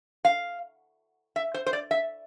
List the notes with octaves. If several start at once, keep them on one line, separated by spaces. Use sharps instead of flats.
F5
E5
C5
C5
D5
E5